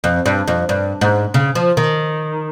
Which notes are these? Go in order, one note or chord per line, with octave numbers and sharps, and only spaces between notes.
F2
G2
F2
G2
G#2
C#3
F3
D#3